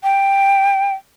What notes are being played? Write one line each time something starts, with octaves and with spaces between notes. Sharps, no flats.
G5